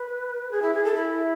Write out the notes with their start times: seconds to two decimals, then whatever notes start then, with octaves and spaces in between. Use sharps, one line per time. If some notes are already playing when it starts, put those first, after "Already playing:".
Already playing: B4
0.51 G#4
0.62 E4
0.73 G#4
0.84 A4
0.94 E4